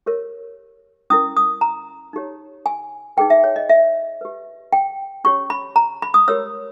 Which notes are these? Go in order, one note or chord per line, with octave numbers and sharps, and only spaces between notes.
G4 A#4 C#5
C#4 E4 A#4 D#6
D#6
A#5
D#4 G4 C#5
G#5
D#4 G#4 B4 G5
E5
C#5
D#5
E5
G4 B4
G5
C#4 G4 C#5 C#6
B5
A#5
B5
D#6
G4 A#4 C#5 E6